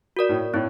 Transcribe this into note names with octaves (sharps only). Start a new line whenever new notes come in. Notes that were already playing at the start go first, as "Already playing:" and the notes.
F#4 A#4 D5
A2
A2 C4